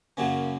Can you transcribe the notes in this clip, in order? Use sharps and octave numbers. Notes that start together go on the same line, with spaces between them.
F#2 C#3 F#3 A#3 C#4